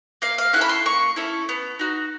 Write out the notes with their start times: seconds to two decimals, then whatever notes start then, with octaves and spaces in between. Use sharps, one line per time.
0.22 A#3 F5
0.38 F5
0.53 C#4 E4 A4 F#5
0.61 B5
0.69 C6
0.85 A#3 C#6
1.16 C#4 E4 A4
1.49 B3
1.79 D#4 F#4